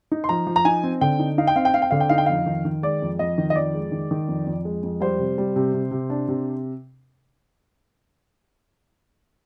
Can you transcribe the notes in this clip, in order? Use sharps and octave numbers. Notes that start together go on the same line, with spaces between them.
D#4
C6
F3 A#5
F3
A#5
D#4 G#5
C4
D3 G5
D#4
D#4 F5
G5
C4 F5
G5
C4 F5
G5
D3 F5
G5
D#4 F5
G5
F2 F5
D#3
D#3
G#3 D5
F2
F2 D#5
D#3
D#5
F2 D5
G#3
D#3
D#3
F2
F2
G#3
F2
G3 C5
C3
G3
C3
C3
C3
D4
C3